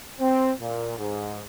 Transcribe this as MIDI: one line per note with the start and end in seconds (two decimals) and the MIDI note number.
0.20 0.51 60
0.61 0.97 46
0.97 1.42 44